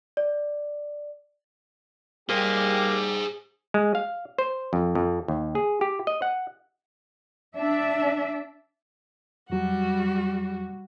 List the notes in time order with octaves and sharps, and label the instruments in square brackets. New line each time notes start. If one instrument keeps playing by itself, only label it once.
[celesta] D5
[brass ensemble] G3 G4 [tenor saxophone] A#3 [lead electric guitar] G#4 C5
[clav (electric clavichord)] G#3
F5
C5
F2
F2
D#2
G#4
G4
D#5
F#5
[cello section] D4 E5
[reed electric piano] F2 F#3 [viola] G3 F#4